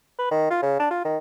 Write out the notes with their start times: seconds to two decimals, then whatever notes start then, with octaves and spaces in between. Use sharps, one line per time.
0.19 B4
0.31 D#3
0.50 F4
0.62 C#3
0.80 D4
0.91 F4
1.05 D#3